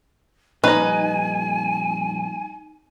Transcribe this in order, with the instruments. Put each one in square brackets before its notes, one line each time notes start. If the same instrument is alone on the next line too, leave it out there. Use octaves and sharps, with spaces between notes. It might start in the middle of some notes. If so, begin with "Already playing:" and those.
[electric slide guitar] F2 A#2 G3 [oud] D#4 [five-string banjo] B4 D#5 [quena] G#5